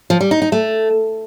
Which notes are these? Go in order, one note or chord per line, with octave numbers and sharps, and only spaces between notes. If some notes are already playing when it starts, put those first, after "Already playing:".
F3
G3
D#4
D#4
A3